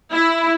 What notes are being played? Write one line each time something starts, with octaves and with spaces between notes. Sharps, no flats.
E4